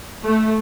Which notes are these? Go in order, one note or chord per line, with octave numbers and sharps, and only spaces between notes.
A3